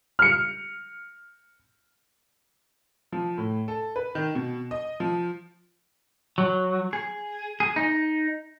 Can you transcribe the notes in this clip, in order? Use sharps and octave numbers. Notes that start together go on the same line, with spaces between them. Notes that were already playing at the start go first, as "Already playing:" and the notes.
F6 C#7
F3
A2
A4
B4
D#3
B2
D#5
F3
F#3
G#4
G#4
D#4